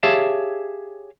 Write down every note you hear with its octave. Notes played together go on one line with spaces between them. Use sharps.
G4 G#4 C#5 E5 F5 A5